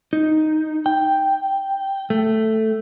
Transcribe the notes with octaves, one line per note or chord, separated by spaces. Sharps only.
D#4
G5
A3